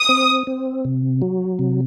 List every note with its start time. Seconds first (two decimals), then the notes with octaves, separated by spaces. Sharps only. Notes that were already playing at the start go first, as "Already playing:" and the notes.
Already playing: D#6
0.09 C4
0.47 C4
0.85 C3
1.22 F#3
1.59 C3